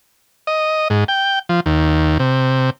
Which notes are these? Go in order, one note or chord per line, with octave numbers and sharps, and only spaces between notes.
D#5
G#2
G5
F3
D#2
C3